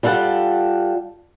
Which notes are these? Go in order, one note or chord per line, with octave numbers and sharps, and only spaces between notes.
G3 F4 A4 F#5